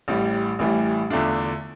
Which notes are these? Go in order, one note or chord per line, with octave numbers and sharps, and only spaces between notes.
A1 A2 G3
A1 A2 E3 G3
E2 D3 A3 D4 F4